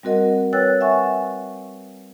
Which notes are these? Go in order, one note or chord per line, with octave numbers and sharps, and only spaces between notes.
G3 C4 F#4 A#4 D#5 F#5
B4 C#5 G5 E6 F#6 A6
E5 F#5 G#5 C#6